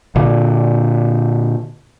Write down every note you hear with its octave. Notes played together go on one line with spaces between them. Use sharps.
A#2 D3